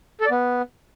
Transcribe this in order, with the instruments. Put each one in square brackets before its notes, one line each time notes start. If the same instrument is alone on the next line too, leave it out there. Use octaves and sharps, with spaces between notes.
[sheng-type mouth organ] A4
D5
B3